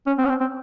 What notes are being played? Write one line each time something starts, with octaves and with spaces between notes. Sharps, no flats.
C#4
C4
C#4
C4
C4